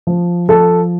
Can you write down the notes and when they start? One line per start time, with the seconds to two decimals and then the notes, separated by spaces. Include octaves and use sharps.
0.07 F3
0.49 F3 A4